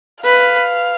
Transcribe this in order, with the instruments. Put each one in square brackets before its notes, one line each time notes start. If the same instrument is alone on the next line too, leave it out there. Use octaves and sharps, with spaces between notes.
[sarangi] B4 [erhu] F5